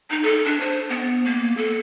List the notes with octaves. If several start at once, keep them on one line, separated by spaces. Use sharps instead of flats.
D#4
A4
D4
C5
B3
A#3
A4